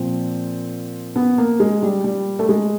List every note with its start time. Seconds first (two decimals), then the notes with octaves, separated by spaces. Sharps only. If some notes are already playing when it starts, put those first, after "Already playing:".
Already playing: A#2 F3 C4
1.16 B3
1.38 A#3
1.60 G#3
1.82 G3
2.04 G3
2.39 A3
2.49 G#3